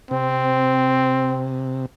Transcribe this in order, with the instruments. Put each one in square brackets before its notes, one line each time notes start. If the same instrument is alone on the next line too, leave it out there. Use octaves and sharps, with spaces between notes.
[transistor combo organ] C3 [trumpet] C4